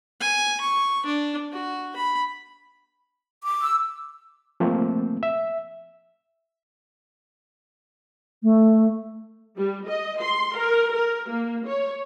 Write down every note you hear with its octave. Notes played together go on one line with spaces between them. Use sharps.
G#5
C#6
D4
F#4
B5
D6
E6
F3 A3 A#3 C4
E5
A3
G3
D#5
C6
A#4
A#4
A#3
C#5